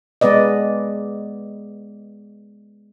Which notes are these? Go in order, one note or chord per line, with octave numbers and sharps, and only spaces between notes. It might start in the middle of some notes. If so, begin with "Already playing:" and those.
G#3 B3 B4 D5 D#5